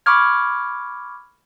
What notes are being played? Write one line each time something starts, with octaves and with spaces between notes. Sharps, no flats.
B5 C#6 D6 F6 G#6